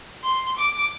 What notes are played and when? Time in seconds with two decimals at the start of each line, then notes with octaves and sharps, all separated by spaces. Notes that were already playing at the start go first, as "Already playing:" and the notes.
0.24 C6
0.58 D6